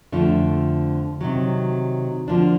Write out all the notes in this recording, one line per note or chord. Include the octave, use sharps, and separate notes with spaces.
F2 D3 F3 A3 D4
C3 D#3 F#3
D3 F3 A#3 D4